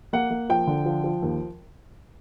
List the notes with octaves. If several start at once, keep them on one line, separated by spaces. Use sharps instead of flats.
A#3 F#5
A#3
F3 G5
D3
F3
F3
D#2